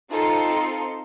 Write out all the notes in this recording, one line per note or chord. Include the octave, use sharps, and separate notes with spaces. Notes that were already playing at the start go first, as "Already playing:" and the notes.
C4 D#4 F4 A4 C6 C#7